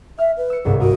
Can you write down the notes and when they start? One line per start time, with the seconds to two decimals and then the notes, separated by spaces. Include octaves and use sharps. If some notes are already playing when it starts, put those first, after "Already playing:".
0.18 E5 F6
0.37 B4
0.50 E6 C#7
0.65 G1 C2 G#2 G#4
0.80 F#4 A#4 D#6 D7